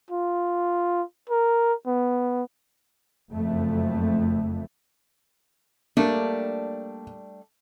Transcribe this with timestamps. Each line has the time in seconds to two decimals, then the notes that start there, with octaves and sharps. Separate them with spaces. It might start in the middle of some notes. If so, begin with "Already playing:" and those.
0.10 F4
1.30 A#4
1.87 B3
3.32 F#1 F2 A3
5.97 G3 A3 A#3 D4